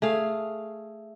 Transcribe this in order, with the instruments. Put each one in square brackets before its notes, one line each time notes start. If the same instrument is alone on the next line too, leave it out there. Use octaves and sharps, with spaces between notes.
[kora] A3 G#4 F5